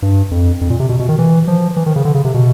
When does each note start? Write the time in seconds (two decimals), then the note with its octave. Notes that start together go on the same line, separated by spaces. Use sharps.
0.02 G2
0.31 F2
0.61 F2
0.70 A#2
0.80 C3
0.89 B2
0.99 B2
1.09 D#3
1.19 E3
1.48 F3
1.76 E3
1.86 D#3
1.96 C#3
2.05 D3
2.14 C#3
2.25 C3
2.34 B2